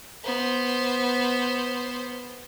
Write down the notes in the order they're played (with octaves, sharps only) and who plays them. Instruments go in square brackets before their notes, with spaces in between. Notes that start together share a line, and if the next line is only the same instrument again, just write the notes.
[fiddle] B3 C5